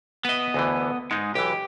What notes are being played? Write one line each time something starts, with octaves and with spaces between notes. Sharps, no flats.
B3 B4 D#5 E5
D2 D3 E3
G#2 G#3 D#4
B1 E3 G4